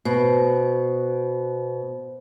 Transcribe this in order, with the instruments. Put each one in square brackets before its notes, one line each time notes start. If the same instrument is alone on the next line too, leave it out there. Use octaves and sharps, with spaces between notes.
[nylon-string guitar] B2 [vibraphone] C5